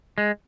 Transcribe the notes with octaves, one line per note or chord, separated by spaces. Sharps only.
G#3